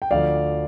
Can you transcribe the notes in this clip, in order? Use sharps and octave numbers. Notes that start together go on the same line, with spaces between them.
G5
D2 D3 F3 D5 F5